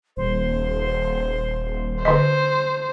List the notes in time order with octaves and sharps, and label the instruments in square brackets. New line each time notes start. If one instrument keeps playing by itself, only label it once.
[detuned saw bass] D#1 [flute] C5
[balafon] D3 D#5 [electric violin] C5